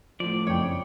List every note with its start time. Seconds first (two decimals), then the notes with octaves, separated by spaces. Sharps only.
0.20 A2 F3 D5
0.47 F#1 F2 C#5 G5